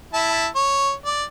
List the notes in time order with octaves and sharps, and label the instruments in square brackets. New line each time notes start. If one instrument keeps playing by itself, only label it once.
[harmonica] E4 E5 A5
C#5
D5